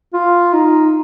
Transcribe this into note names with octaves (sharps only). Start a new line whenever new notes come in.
F4
D#4